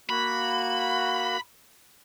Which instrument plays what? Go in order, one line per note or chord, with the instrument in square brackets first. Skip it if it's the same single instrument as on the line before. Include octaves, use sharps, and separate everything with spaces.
[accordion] A#3 F#4 [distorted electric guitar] B5